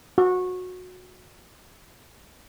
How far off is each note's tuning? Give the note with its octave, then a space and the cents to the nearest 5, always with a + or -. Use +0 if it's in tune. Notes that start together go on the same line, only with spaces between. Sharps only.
F#4 -20